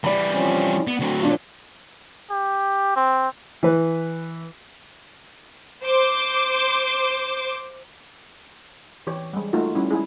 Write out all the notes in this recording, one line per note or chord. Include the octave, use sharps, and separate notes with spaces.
E3 G3 D5 B5
F3 C4 C#4
B3
D2 F#3 C4
A#2 D4 F4
G4
C4
E3 B4
C5 D6
E3 G4 C#5
G3 G#3
A3 A#3 D#4 F4 F#4
G3 C#4 E4
G#3 E4 G#4